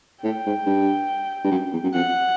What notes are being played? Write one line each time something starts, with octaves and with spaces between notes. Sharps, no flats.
A2 G5
G#2
G2
G2
F#2
E2
F#2
F2 F#5